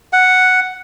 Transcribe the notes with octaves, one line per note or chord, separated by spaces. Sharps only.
F#5